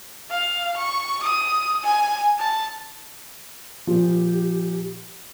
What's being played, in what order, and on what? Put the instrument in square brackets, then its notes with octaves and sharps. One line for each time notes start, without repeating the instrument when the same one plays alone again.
[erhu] F5
C#6
D#6
G#5
A5
[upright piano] A#2 F3 [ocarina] G4